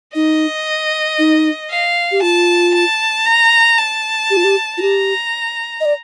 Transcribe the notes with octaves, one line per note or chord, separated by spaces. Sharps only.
D#4 D#5
D#4
F5
G4
F4 A5
A5
A#5
A5
G4
F4
G4
F4
G4 A#5
D#5
D5